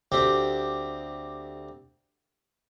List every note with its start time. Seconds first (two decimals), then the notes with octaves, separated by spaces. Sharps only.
0.12 D2 C4 G4